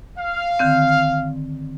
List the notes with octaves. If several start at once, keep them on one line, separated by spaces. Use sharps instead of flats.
F5
D3 D#3 C4